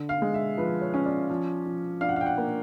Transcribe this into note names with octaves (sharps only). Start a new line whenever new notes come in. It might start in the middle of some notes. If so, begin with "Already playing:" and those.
Already playing: D3
F5
G#3
E5
F3 B4
C#5
C#4
D5
F3
F3
D4 F5
F#5
F5
G5
F#5
A#3